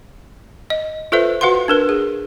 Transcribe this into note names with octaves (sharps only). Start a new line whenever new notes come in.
D#5
F4 A4 B4 C5 E5
F#4 B4 F5 F#5 C6
D4 A#4 B4
G#4